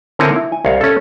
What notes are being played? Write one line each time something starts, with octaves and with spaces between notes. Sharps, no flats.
D3 C4 E4 A#4 C#5 G#5
E4
G#5
C2 C#5 F5
C#4 A4